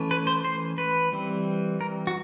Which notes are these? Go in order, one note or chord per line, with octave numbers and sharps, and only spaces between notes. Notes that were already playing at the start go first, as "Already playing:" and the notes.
Already playing: E3 A3 C#4
B4
C5
C5
B4
E3 G3 C4
A#4
F#4